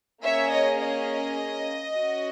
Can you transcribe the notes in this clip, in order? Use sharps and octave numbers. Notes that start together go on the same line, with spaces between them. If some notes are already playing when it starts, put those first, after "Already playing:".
A#3 C#4 G#4 C#5 E5
D#5
D#5
C#4 F#4